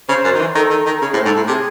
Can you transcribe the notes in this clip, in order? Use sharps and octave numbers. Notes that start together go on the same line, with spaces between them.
C#3 C5
F#2
D#3
E3
D#3 A4
D#3
D#3
C#3 G#4
A2
C5
G#2 A4
A2
C3 G#4